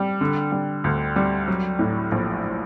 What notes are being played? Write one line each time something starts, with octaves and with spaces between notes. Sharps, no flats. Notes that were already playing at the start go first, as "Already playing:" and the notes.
Already playing: G3
D3
G3
D2
G3
F#3
A2
A#1